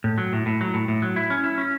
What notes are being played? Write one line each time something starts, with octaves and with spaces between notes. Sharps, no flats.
A2
F#3
A2
A2
F#3
A2
A2
F#3
E4
C#4
E4
C#4